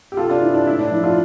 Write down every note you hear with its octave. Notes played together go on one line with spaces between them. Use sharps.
G4
C3 F4 A4
D4 F4
E3 E4
D4
A2 E4
D4
F3 E4
D4 F4